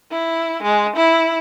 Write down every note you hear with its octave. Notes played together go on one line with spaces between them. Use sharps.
E4
G#3
E4